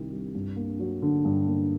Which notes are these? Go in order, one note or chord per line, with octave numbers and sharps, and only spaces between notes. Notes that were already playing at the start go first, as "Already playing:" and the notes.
Already playing: C2 C3 D#3 G3
G3
G2
A#3
F#3
D3
G2
A#3